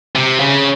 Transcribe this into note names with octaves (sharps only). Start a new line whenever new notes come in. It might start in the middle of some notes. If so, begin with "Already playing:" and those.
C3
C#3